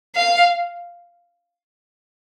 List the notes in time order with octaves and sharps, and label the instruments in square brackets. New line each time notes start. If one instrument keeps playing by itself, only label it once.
[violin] F5